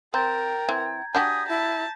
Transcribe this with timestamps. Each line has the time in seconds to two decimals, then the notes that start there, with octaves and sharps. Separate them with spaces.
0.14 C4 A#4 G5 A#5 G6 A6
0.69 E3 C4 G#6
1.15 D4 F#4 G4 G#5 D#6 G6 A#6 B6
1.49 E4 A5